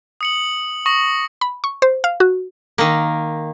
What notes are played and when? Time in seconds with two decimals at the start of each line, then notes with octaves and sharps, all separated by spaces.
0.21 D#6 C#7 F#7
0.86 C#6 D#6 A#6 F#7
1.41 B5
1.64 C#6
1.82 C5
2.04 F5
2.20 F#4
2.78 D#3 A#3